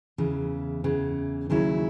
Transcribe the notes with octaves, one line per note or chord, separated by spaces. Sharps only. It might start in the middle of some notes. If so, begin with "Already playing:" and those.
E2 C#3 E3
E2 C#3 E3
D#2 C#3 F#3 C#4 E4